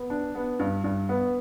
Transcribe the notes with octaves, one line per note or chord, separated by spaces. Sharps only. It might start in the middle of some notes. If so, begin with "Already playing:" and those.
Already playing: B3
D4
B3
G2
G2
B3